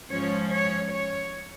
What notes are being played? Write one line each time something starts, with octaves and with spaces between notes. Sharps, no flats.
G#2 F3 C#4 C#5
C#5
C#5